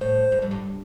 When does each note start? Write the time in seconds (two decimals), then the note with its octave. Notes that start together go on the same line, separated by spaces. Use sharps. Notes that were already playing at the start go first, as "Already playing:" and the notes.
0.01 A2 C5
0.32 G2
0.42 F2
0.51 G2